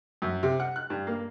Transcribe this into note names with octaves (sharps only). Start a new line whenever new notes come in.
F#2
C3
F#5
F#6
G2
A#3